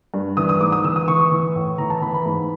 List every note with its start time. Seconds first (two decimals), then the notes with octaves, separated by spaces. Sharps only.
0.14 G2
0.37 E3 D#6
0.49 D#6
0.60 G#2 D6
0.72 D#6
0.84 E3 E6
0.96 D#6
1.08 E3 C#6
1.20 C#6
1.32 E3
1.55 A2
1.78 E3 A#5
1.90 A5
2.02 E3 B5
2.14 B5
2.26 G#2